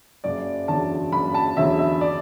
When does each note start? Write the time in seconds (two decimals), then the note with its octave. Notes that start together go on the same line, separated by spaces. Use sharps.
0.24 F#1 D5
0.68 E2 D3 F#3 A5
1.12 F#1 B5
1.34 A5
1.57 E2 D3 F#3 E5
1.79 E5
2.01 D5